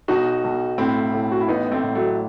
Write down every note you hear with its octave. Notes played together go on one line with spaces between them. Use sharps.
B1 D#4 F#4
B1
A2 C4 E4
A2
F#4
E4
A1 B3 D#4
A3 C4
A2
F#3 A3